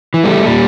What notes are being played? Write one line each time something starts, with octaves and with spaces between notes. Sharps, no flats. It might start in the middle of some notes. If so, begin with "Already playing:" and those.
E3
G3 A3
A#2 G3